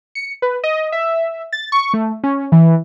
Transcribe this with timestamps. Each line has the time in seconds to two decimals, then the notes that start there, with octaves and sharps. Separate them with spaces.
0.15 C#7
0.42 B4
0.64 D#5
0.92 E5
1.53 A6
1.72 C#6
1.94 A3
2.24 C#4
2.52 E3